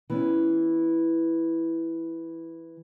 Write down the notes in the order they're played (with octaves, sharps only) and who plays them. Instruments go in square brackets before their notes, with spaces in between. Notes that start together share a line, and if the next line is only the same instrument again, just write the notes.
[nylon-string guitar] E3 B3 C#4